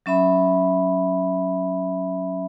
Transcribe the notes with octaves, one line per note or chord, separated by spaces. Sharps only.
F#3 C#4 E5 B5